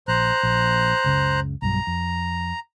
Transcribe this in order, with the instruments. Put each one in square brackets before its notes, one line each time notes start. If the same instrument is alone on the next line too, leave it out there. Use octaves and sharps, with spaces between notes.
[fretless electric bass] A#1 [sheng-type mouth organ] C5 A#5 F#6
[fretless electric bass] A#1
F#1 C#2 C#3
[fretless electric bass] B1 G2 F#3 [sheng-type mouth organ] A#5
[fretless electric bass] F2